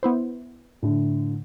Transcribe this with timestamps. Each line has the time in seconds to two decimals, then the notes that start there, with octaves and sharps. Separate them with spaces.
0.03 B3 E4 C5
0.82 A2 D3